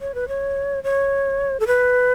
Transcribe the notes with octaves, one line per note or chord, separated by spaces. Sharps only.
C#5
B4
C#5
C#5
A4
B4